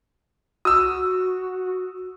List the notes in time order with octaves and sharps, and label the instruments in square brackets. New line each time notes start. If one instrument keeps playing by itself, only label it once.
[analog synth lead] F#4 [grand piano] D#6 E6